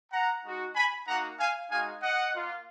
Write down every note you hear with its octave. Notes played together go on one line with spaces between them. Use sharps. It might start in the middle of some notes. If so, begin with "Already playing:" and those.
F#5 A#5
G#3 D#4 F#4
G#5 B5
A#3 D#4 F#4 F#5 A#5
F5 G#5
G#3 D#4 F#4 F5 G#5
D#5 F#5
A#3 F4